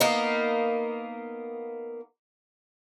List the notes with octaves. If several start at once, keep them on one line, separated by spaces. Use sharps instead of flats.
A#3 B3 D#4